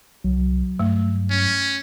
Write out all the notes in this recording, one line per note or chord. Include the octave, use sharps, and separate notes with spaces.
C2 F#3
G2 A3
C#4